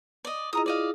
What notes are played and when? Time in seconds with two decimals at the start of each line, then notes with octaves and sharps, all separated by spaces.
0.25 D5 D#5
0.53 E4 F4 G#4 D#5 A#5 D#6
0.66 D5 D#5 F5